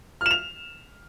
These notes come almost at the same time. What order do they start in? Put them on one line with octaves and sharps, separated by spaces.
F6 E7 F7